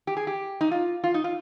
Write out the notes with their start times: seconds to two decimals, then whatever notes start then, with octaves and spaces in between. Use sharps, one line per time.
0.07 G4
0.17 G#4
0.27 G4
0.61 D#4
0.71 F4
1.04 F4
1.14 D#4
1.24 F4